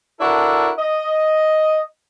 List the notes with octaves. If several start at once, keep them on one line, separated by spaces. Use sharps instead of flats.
D4 E4 F#4 A4 A#4
D#5